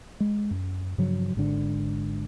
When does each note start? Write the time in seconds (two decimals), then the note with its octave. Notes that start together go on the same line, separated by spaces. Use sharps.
0.20 G#3
0.51 F#2
0.98 G2 C#3 F3 F#3
1.35 G#1 G#2 D3